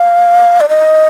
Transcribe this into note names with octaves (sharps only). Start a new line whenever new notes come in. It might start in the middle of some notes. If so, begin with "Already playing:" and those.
Already playing: F5
D5
D#5